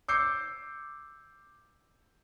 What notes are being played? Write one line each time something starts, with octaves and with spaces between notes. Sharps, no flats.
D6 E6 G6 C7 C#7